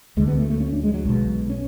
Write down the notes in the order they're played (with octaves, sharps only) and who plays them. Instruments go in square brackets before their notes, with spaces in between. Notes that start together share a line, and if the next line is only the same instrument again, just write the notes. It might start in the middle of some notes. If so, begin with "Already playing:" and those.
[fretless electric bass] D2 D3 G#3
B3
A3
A3
C#4
D4
G#3
F#3
B1 B2 G#3
C#4